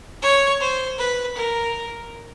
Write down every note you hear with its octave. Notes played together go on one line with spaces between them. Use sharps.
C#5
C5
B4
A#4